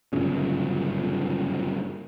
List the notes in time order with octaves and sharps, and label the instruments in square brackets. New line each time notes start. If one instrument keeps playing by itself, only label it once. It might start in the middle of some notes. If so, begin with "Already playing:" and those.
[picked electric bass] G1 F#2 A#2 C#3